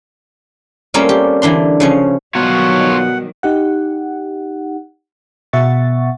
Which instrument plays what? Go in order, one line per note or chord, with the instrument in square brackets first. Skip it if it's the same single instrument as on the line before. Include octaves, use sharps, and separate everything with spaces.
[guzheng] G3 A3 A#3 C4 C#4 F4
G4
D3 E3 D4 C6
C#3 F3 C#4
[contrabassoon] B2 [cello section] D#3 F#3 G3 [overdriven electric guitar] F4 C#5 [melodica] F#5
[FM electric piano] D#4 G4 F#5
B2 E5 F#5 C#6 A6